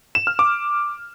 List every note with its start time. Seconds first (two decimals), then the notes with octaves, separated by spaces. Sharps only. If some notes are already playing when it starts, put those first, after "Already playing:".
0.15 E7
0.27 F6
0.39 D6